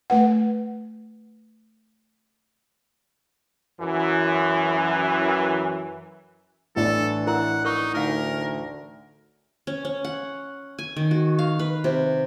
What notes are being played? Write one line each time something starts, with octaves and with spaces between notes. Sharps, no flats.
A3 B4 F#5
F#2 E3
A1 E3 D4 A4
E4 A#4 F#5 A#5
D#4 A#4 C#6
D2 D#4 A#4 F#5
C#4
C#4
F#5
G#5
D#3
F#4
F5
B4
C3